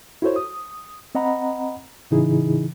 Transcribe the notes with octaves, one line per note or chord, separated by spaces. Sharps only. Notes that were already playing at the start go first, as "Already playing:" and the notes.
E4 F#4 A4 C5 C#5
D#6
C4 D#5 F#5 A#5 B5
A2 C#3 E3 D#4 E4 G#4